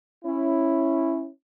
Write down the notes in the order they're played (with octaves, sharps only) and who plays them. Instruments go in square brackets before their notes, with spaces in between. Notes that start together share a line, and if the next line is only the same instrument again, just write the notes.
[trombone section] C#4 E4